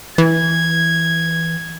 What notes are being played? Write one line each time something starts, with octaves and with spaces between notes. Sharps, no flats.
E3 G#6